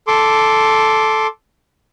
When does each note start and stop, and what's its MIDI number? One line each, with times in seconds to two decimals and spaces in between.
0.07 1.27 69
0.07 1.27 84
0.07 1.27 86